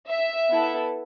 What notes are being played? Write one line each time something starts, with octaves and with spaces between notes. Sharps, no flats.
E5
B3 E4 A4